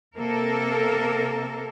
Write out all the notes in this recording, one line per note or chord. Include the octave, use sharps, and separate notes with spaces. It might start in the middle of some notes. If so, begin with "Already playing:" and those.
C3 A#3 A4 A#4